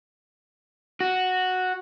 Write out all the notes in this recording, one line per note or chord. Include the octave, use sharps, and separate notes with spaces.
F#4